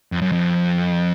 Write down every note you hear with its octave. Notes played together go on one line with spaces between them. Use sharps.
F2
F#2
F2